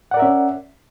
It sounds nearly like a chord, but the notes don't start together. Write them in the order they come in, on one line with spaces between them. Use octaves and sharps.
F#5 D5 A#4 E5 C#4